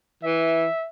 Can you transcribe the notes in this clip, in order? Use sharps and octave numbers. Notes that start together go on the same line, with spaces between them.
E3 E5